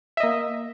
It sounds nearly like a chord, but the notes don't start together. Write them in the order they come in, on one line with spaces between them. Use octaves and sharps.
E5 D#5 A#3